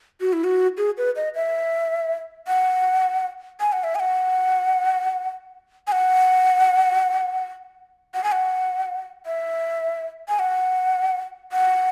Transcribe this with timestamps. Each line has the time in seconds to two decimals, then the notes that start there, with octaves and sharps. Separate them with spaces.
0.21 F#4
0.33 E4
0.44 F#4
0.77 G#4
0.98 B4
1.16 D#5
1.35 E5
2.47 F#5
3.60 G#5
3.72 F#5
3.84 E5
3.95 G#5
4.00 F#5
5.87 G#5
5.92 F#5
8.14 F#5
8.24 G#5
8.32 F#5
9.26 E5
10.29 G#5
10.39 F#5
11.52 F#5